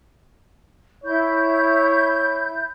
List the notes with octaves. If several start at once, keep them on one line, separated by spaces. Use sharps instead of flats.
E4 C#5 G6